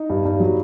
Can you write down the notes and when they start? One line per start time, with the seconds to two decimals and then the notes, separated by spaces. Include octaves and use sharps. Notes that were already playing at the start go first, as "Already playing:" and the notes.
Already playing: D#4
0.10 G2
0.25 G2
0.40 F#3